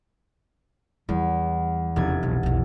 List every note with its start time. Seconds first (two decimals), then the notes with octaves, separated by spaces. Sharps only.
1.09 E2 G3
1.96 F1 E2 C#3 G#6
2.23 B1
2.43 B1 E2